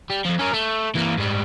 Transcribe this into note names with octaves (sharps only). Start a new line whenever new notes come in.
G3
F2 F3
C#4 A#4
A3
E3 A#3
G#2 G3